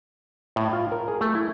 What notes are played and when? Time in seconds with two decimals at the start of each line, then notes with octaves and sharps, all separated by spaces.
0.56 A2
0.73 F4
0.92 A#4
1.08 G#4
1.21 A3
1.35 E4